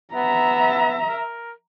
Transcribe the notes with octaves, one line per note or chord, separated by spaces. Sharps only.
B3 E5 A#5
A#4